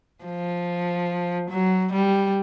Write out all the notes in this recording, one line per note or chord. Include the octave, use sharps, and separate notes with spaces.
F3
F#3
G3